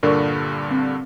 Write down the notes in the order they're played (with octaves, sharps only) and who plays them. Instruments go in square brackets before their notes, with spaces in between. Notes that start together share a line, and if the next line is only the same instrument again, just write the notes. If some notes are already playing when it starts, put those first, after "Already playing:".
[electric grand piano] G2 A#2 D3 [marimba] A#4 D5 C#6
[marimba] C4